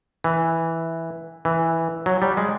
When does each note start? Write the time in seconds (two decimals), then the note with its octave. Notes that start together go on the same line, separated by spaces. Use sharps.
0.24 E3
1.45 E3
2.06 F#3
2.22 G3
2.37 G#3